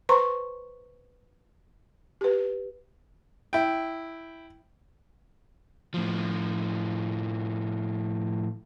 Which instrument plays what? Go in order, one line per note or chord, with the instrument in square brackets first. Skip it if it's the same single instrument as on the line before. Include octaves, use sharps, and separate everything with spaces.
[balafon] B4 C5 A#5 C6 C#6
G4 B4
[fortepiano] E4 G5
[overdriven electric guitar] A2 F3